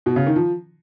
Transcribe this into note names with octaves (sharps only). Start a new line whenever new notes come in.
B2
C#3
D#3
F3